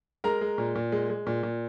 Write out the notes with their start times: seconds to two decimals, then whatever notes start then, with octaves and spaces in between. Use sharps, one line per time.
0.24 G#3 A#4 A#5
0.41 G#3
0.58 A#2
0.75 A#2
0.92 G#3
1.09 G#3
1.27 A#2
1.43 A#2